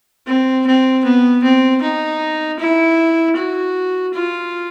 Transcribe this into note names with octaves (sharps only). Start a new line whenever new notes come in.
C4
C4
B3
C4
D#4
E4
F#4
F4